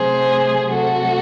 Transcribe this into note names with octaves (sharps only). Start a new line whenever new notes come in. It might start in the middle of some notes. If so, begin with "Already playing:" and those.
Already playing: C3 F#3 A3 G#4 C5
C3 F#3 A3 F#4 A4